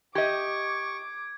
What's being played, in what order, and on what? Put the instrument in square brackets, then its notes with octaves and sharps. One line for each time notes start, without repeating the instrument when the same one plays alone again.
[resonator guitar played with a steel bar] G4 D#5 [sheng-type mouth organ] C#6 [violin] D6 [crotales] G#6